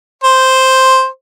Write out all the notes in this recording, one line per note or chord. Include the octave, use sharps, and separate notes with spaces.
C5